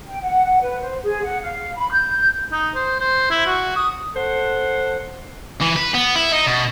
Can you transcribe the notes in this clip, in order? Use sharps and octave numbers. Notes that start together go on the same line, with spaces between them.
G5
F#5
B4
C5
G#4
F#5
F5
B5
G6
D#4
C5
C5
E4
F#4
D#6
A4 C5 F#5
E3
B4
B3
E4
D#4
B2